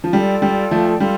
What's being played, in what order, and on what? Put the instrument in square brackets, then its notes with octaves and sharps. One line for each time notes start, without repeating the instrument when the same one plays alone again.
[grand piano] F3
[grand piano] G3 [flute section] F4 A4 D5 G5
[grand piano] G3
F3 A3
[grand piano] G3 [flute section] F4 A4